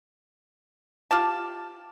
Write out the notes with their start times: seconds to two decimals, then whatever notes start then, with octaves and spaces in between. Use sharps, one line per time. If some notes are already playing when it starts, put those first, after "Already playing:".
1.11 F4 G4 A5